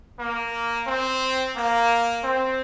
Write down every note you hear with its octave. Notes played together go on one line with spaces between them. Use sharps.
A#3
C4
A#3
C4